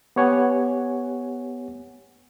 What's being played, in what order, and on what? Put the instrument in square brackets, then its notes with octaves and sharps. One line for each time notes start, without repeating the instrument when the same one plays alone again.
[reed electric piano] B3 G4 C#5 F#5 G#5